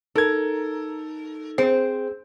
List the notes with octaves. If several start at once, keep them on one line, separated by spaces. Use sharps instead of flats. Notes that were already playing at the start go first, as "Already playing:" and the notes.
D#4 A4 A#4 G#6
C4 G#4 C5